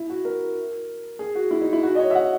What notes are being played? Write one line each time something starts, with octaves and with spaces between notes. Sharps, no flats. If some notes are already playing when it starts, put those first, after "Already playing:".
Already playing: E4
F#4
A#4
G#4
F#4
E4
D#4
E4
F#4
D#5
C#5
E5
F#5